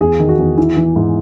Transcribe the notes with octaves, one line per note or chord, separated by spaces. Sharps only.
E2 G#4
D#3
F#4
E2
E3 E4
E3
G#2